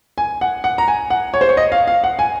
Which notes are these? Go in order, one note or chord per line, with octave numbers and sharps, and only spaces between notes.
G#5
F#5
F#5
A#5
G#5
F#5
C#5
C5
C#5
D#5
F5
F5
F#5
G#5